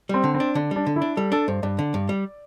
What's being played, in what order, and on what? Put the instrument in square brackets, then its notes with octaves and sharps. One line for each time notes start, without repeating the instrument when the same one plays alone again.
[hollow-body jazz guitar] G3 [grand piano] C4
[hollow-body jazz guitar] D3
[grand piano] C4
[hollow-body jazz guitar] D4
[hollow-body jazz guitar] D3 [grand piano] D4
[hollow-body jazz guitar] G3 [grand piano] D4
[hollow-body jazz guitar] D3
[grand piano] E4
[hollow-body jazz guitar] D4
[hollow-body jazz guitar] G3 [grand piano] A4
[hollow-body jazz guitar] D4 [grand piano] A4
[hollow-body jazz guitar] G2 [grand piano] C5
[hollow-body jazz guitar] G2 [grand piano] D5
[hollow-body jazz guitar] D3
G2
G3